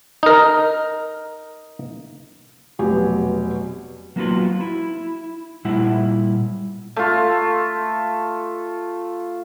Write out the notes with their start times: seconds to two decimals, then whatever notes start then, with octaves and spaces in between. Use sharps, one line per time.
0.23 D#4 A#4
2.79 F1 B2 F#3 G4 G#5
4.16 F#3 A#3 B3 D#4 F4 F#4
4.61 E4
5.65 A#2 G3 E4 F#5
6.96 A3 F4